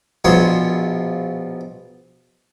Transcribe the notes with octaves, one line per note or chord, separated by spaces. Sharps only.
A#1 B2 F3 C#5 C6